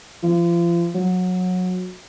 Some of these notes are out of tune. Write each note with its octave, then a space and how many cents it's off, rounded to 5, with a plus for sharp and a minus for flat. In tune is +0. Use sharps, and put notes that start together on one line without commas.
F3 -35
F#3 -20